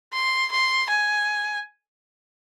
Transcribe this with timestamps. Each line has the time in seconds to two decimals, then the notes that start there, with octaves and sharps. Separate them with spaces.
0.13 C6
0.52 C6
0.89 G#5